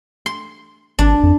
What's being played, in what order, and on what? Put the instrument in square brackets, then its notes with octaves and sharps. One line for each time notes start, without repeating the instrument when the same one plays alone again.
[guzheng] C6
[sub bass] G#1 [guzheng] D4
[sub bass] F2